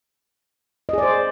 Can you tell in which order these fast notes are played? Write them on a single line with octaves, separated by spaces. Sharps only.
D#5 G#4 D5 C5